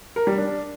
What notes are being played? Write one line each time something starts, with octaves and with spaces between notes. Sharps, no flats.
A#4
G3
D4